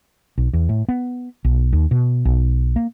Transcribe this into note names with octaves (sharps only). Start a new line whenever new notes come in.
B1
E2
A2
B3
B1
D#2
B2
B1
A#3